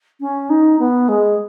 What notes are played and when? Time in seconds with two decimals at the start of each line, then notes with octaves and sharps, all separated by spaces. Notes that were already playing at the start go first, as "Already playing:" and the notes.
0.20 C#4
0.50 D#4
0.79 B3
1.09 G#3